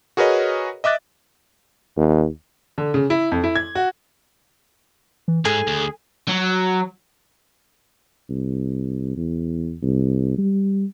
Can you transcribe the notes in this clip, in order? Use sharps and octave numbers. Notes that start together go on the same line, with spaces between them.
F#4 G#4 A#4 B4 C#5 D#5
D#5 E5 D6 F#6 A6
D#2
D3
C#3
E4
F2
E4
G#6
F#4
E3
G#2 G#4 A4
D2
F#3
C2
E2
C2
G3